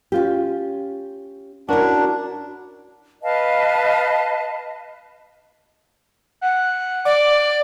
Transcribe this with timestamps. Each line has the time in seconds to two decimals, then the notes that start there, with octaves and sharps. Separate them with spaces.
0.12 C#4 F4 G4
1.69 C#4 D4 E4 F#4 A#4
3.22 B4 D#5 F5 A5
6.41 F#5
7.05 D5 D6